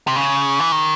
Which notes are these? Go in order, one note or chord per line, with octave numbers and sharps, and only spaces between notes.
C3
C#3
E3
D#3